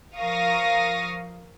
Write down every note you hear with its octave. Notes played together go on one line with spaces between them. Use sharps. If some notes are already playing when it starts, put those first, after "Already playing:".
F3 A#4 F5 C#6 D#6 A#6